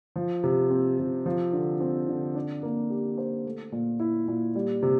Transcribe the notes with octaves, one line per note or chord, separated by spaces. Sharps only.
F3
C3
C4
C3
F3
D3
C4
D3
D4
A#3
G4
C5
A3
A#2
E4
A#2
G3
C3